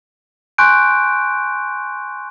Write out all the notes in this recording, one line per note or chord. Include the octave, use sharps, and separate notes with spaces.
G#5 C6 C#6 F#6 G6 D7